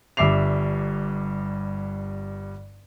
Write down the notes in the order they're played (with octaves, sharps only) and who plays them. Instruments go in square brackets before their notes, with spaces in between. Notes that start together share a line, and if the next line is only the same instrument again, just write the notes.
[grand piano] G1 G2 E5 D6 C7 F7